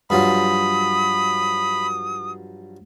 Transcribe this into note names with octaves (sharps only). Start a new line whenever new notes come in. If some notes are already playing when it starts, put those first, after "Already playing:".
G2 F3 F#3 B5 D#6